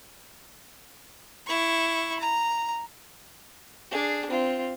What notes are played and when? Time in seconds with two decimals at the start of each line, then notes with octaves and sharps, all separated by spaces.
1.47 E4 C#6
2.19 A#5
3.91 D4 G#4
4.30 C4 F4